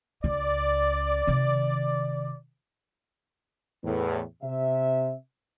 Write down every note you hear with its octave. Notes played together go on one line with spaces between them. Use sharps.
C#2 C#3 D5
C3 D#3
E2 A2
C3 E5